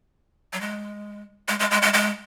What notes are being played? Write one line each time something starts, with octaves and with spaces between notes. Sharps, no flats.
F#3
G#3
G#3
G#3
G#3
G#3
G#3